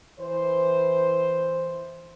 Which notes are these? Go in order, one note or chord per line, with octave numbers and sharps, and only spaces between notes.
E3 C5